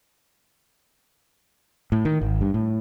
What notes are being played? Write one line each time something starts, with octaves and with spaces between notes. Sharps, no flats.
A2
D#3
G#1
G2
A2